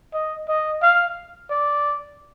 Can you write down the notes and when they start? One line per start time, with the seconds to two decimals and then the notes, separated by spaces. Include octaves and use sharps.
0.14 D#5
0.48 D#5
0.83 F5
1.50 D5